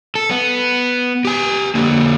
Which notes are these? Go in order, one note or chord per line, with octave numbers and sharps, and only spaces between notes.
A4
B3
G4 G#5
D3 A#3